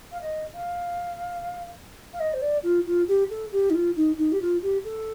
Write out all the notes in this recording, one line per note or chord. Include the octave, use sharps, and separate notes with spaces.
F5
D#5
F5
F5
D#5
C5
D5
F4
F4
G4
A4
G4
D#4
F4
D#4
D#4
G4
F4
G4
A4